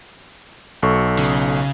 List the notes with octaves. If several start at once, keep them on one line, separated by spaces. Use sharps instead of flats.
B1 A4 C#6
C#3